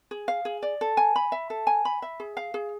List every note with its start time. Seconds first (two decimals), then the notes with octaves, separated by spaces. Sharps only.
0.11 G#4
0.28 F5
0.45 G#4
0.63 D5
0.81 A4
0.97 G#5
1.16 B5
1.32 E5
1.50 A4
1.67 G#5
1.85 B5
2.02 E5
2.20 G#4
2.37 F5
2.54 G#4